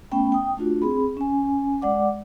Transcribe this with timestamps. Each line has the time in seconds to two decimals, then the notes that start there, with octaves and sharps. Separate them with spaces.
0.11 A3 B3 C#4 G5 B5
0.32 G5 D#6
0.57 A3 D4 F4 F#4
0.82 C4 G#4 B5
1.17 C#4 G#5
1.82 G#3 D5 F#5 D6